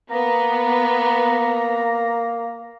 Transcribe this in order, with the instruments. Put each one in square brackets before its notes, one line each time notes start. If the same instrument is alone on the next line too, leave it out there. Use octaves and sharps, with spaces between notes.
[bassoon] A#3 [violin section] B3 [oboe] A#5